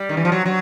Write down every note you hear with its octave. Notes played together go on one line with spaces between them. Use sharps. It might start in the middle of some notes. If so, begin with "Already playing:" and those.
Already playing: G3
D#3
E3
F3
F#3
F#3